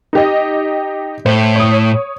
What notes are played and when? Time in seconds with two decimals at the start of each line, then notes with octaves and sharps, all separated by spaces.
0.13 D#4 G4 D#5
1.26 A2 C5
1.56 C#5 D#6